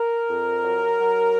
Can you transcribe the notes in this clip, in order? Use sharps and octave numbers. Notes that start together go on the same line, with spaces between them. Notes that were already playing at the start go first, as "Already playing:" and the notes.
Already playing: A#4
F2
F#3
F#3